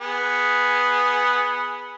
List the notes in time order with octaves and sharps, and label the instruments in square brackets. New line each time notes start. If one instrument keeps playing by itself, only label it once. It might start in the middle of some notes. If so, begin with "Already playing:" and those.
[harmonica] B3 G#4